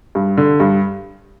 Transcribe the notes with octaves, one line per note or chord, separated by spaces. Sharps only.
G2
D3
G2